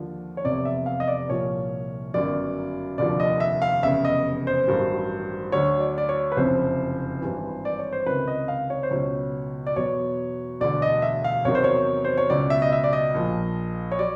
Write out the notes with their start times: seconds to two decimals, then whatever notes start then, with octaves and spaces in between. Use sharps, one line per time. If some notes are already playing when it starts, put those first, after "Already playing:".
Already playing: D#2 D3 F3
0.37 C#5
0.44 F1 E2 C3 D5
0.65 E5
0.86 F5
1.00 D#5
1.08 D5
1.29 C2 A#2 F3 C#5
2.14 G1 F#2 D#3 F#3 D5
2.98 F1 D#2 D3 F3 D5
3.20 D#5
3.40 E5
3.62 F5
3.82 F1 E2 C#3 E5
4.05 D#5
4.47 C5
4.68 A1 G2 D#3 F#3
5.52 D2 D3 F#3 C#5
5.80 D5
5.98 D5
6.09 C#5
6.32 B4
6.37 F#1 F2 C3 C5
7.21 G#1 G2 E3
7.65 D5
7.79 C#5
7.93 C5
8.06 C#2 C3 D#3 B4
8.28 D#5
8.48 F5
8.70 C#5
8.83 C5
8.91 C#2 B2 F#3 C#5
9.67 D5
9.76 E2 B2 F#3 C#5
10.60 E1 D2 D3 D5
10.82 D#5
11.02 E5
11.24 F5
11.45 E2 C3 D#3 F#3 C#5
11.55 C5
11.64 C#5
12.05 C5
12.18 C#5
12.30 C#2 B2 F#3 D5
12.50 E5
12.62 D#5
12.73 E5
12.84 D5
12.93 D#5
13.15 A#1 A#2 F3
13.92 C#5
13.99 F#3 D5